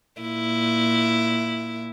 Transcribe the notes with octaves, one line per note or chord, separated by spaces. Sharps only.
A#2 E4